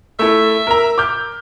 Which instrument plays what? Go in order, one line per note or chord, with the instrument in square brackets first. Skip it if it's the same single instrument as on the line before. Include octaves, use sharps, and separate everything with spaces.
[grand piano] A3 E4 A4 [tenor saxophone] E5
[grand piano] A#4 A#5
D6 F6 G6